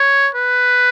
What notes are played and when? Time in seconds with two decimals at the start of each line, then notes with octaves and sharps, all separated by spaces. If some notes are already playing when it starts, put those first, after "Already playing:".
Already playing: C#5
0.35 B4